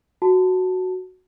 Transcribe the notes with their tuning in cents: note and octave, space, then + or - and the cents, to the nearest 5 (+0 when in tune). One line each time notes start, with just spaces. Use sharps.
F#4 +0 A5 +0